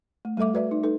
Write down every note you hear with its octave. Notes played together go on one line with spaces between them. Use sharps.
A3
G3 A3 A4 E5 D6
F#4 B4 D5 E5
D#4
D#4 A4 B4